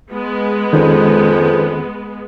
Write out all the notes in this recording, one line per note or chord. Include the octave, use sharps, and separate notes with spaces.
G#3 B3
F2 D#3 C#4